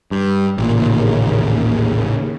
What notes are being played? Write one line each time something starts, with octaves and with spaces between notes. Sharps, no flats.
G2
A1 D#2 A#2 C#3